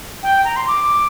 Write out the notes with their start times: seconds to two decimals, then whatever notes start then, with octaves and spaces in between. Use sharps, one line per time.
0.23 G5
0.45 A#5
0.56 C6
0.68 D6